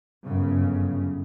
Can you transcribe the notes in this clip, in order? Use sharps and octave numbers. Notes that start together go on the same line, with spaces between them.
G1 F#2 C#3